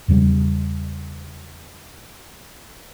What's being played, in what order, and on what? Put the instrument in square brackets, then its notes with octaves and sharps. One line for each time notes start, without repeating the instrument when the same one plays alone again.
[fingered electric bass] E2 C#3 G3